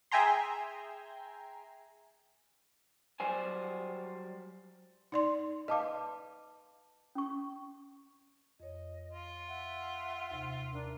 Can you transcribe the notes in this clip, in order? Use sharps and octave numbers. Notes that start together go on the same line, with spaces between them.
G#4 E5 G5 G#5 A#5 C6
F#3 G3 C5 G#5
D#4 D5 C6
B4 D#5 F5 A5 D6
C#4 C#6
F2 C#5 D#5
F4
E5 F#5
D#2 C3
D4 A#4